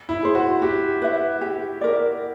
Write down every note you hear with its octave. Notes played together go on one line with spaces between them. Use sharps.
E4
G#4 C5
F#4
F#4 G4
B4 E5
G4
A#4 D5